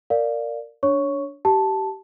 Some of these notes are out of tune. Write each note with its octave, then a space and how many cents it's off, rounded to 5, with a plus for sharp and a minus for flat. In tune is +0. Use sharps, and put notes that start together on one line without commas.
A#4 -15 D5 +0 F5 +0
D4 -20 C#5 +0 C#6 +5
G4 -25 A5 +0